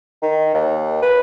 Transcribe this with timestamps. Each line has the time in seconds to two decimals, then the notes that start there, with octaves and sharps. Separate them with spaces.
0.22 D#3
0.54 D#2
1.02 B4